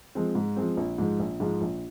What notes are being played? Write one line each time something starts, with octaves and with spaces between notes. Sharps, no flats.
F3 G#3 C4
G#2
F3 G#3 C4
A#1
G#2 F3 G#3
A#1
G#2 F3 G#3
A#1